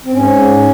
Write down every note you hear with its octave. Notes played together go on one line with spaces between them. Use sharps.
C4
G#2 C#4